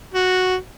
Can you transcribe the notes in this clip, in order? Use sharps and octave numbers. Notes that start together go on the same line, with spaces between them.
F#4